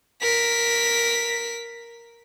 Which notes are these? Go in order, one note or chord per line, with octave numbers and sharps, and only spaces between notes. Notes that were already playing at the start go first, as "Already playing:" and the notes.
A#4 B6